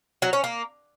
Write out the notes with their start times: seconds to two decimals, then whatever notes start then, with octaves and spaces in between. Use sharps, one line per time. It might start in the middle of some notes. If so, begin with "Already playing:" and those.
0.22 F#3
0.33 C#4
0.44 A#3